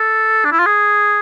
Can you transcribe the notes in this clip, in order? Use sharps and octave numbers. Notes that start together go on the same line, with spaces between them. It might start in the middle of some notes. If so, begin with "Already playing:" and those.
Already playing: A4
D4
E4
F4
G#4